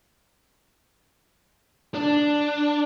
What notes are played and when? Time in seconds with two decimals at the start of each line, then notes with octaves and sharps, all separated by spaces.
1.95 D4